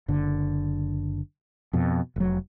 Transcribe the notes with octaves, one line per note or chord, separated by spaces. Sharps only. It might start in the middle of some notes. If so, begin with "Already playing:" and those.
F#1 D3
F2 B2
F1 F#3